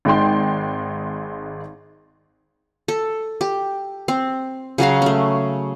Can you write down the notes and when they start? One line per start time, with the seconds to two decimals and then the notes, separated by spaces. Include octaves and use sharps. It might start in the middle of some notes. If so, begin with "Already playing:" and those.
0.05 G#1 G#3 G5 C6
2.88 A4
3.41 G4
4.08 C4
4.78 C#3 F#3 F#4 F5
5.02 A3 C#4